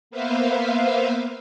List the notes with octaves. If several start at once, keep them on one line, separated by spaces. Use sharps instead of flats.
A#3 B3 B4 C5 E5 F5